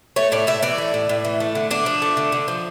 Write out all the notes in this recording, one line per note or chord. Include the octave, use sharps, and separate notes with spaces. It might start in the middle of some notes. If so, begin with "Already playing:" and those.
A3 C#5
A2 D5
A2 E5
E3 D5
A3
A2
A2
E3
A3
D3
D3 D4
F3
A3
D3
D3
F3